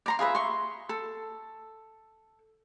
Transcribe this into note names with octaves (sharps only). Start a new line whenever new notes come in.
D5 A#5 C6
F4 G#4 B4 E5
C6 C#6
A4